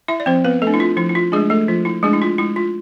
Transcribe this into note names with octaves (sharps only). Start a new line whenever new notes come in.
E4 E5
D5
F3 C4 C5
B3 B4
A3 A4
D4
E4
F4
F3 E4
E4
F4
G#3 A3 D4 G#4
A3 A4
F3 F4
E4
G#3 A3 D4 G#4
E4
F4
G#3 E4
F4